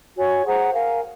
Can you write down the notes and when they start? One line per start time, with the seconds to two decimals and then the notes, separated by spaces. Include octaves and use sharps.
0.16 F#4 C#5 G#5 C#6
0.45 G#4 C5 F#5 A#5
0.73 A#4 F5 G#5